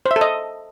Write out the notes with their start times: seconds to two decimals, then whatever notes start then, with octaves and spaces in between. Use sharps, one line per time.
0.06 C5
0.11 E5
0.16 A4
0.21 D#5